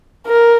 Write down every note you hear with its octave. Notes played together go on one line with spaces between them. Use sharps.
A#4